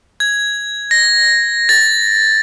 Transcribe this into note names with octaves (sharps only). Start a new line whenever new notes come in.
G#6
A#6
A6